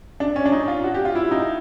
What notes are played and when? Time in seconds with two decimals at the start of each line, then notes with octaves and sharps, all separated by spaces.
0.20 D4
0.36 C#4
0.46 D4
0.52 D#4
0.68 F4
0.84 F#4
0.94 G4
1.05 F4
1.15 E4
1.31 D#4